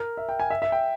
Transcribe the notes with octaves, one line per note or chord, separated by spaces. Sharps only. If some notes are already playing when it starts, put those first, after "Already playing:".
Already playing: A#4
E5
G5
G#5
E5
E5
G5